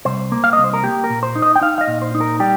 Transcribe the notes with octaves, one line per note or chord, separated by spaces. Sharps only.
C2 C5
A#3
F5
C2 D#5
C5
A#4
A#3 G4
A#4
A#2
C5
D#4
D#5
G5
D#4 F5
F5
D#5
A#2
C5
D#4
A#4
G3 G4